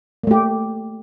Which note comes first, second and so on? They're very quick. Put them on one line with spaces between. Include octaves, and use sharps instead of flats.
A#3 A3 G4